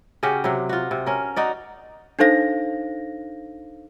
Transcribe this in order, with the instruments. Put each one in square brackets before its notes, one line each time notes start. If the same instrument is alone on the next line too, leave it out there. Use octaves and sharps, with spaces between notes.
[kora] C#3 C#4 F#4 G4
C3 F#3
F4 F#4
C3
C#4 A#4
D#4 F#4 D5
[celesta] D4 D#4 A4 C5 F5 A#6